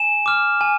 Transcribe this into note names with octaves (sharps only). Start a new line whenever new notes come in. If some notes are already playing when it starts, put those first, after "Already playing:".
Already playing: G#5 E7
D6 F6
G#5